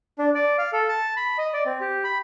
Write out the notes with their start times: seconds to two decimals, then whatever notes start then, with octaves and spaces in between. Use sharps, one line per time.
0.19 D4
0.35 D5
0.58 F5
0.73 A4
0.89 A5
1.16 B5
1.38 D#5
1.53 D5
1.66 C4
1.81 G4
2.04 B5